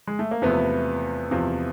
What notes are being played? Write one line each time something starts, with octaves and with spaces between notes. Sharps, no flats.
G#3
A3
A#3
E2 C3 F3 A3 B3
E2 C3 F3